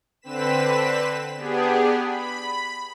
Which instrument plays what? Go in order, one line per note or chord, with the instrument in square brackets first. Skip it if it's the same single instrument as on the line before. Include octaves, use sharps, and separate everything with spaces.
[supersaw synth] D3 C4 B4 B6 E7
B3 D4 G4 G#4
B5